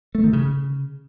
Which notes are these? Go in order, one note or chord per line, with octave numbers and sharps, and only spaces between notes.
A3
D#3
C#3